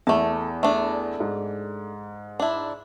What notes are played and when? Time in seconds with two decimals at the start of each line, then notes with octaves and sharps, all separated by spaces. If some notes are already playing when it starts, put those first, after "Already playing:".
0.07 E2 A3 A5
0.63 A3 D4
1.20 G#2
2.40 D4 E4